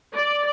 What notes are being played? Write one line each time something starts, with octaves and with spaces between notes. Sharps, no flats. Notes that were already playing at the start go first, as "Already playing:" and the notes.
D5